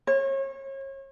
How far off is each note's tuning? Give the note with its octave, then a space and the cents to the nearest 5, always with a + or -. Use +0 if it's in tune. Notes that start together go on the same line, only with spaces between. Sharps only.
C#5 -35